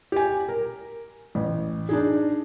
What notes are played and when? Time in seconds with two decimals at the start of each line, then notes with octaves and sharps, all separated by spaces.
0.12 G4 G#5
0.48 A#4
1.35 A1
1.89 D4 D#4 G#4